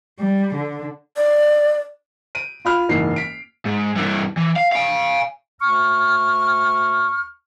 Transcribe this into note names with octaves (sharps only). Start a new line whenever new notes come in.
G3
D3
D5
D7 D#7
F4 B5 F6
F#1 G#2 E3 C7
B6 D7
G#2
G2 E3
E3
F5
F5 G#5
D2 C#6 F6